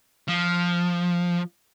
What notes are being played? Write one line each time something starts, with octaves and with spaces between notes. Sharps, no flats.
F3